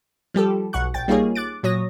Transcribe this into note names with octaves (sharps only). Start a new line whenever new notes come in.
F3 G3 G4 A4
B1 F#5 C#6 F#6
A#1 G5 A6
G3 A#3 D#4 F4 G#4 C#5
D6 F#6 A6 D7
A#2 F#3 C#5 D#6 A#6